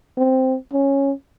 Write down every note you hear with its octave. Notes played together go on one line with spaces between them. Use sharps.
C4
C#4